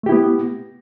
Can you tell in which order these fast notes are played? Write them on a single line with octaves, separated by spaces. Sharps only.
A3 G4 E4 B3